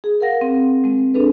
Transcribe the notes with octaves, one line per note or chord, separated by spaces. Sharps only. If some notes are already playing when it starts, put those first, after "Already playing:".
G#4
A#4 F5 F#5 A#6
C4
G#3 C4
C4 D4 G#4 A4 B4